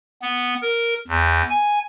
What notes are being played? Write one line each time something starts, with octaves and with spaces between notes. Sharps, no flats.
B3
A#4
E2
G#5